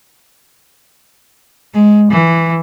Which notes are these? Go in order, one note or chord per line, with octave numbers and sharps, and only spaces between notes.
G#3
E3